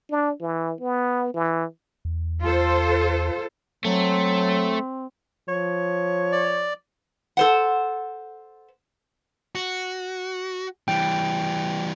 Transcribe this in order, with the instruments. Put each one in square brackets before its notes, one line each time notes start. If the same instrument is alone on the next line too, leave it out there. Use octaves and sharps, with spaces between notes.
[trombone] D4
E3
B3
E3
[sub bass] E2
[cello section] F4 A4 C5
[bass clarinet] F#3 [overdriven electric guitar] A3 [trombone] C4
[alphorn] F3 [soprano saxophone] C#5
[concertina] D5
[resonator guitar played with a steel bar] A4 C5 F#5
[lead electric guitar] F#4
[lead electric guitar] E3 G3 [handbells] G5